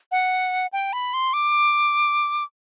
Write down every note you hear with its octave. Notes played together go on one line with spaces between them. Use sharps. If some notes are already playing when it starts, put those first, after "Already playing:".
F#5
G5
B5
C6
D6